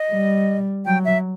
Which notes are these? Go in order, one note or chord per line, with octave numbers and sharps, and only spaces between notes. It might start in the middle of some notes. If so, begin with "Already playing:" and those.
Already playing: D#5
G3
F#3 G5
E5